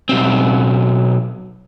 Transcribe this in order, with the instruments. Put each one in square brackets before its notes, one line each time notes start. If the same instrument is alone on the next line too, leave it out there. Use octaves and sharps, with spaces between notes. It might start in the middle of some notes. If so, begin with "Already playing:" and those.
[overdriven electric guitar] B1 C4